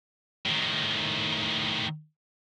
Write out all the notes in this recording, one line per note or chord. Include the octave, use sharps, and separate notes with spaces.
A2 D#3